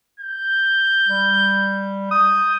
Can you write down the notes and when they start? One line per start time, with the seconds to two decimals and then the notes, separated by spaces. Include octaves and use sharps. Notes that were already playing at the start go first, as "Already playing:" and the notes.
0.20 G6
1.08 G3
2.11 D#6 G6